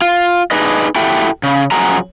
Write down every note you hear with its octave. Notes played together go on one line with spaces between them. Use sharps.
F4
D4 D#4 G#4 B4 D#5
E4 F#4 G4 A4 E5 G5
C#3
F#2 F3 F#4 G#4 A#5